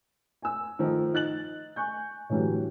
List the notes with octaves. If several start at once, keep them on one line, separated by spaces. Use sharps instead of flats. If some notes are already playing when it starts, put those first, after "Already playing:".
G#5 E6
D#3 F3 A3 D#4
D#4 F#6 A6 F#7
G#5 C#6 F#6 G6
A2 D3 E3 F#3 G3